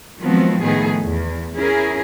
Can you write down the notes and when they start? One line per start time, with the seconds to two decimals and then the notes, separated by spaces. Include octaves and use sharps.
0.21 D#3 F3 F#3 G#3 B3 C4
0.62 A2 D#3 F3 A3 B3 G#4
1.03 E2
1.56 C#4 E4 G#4 A#4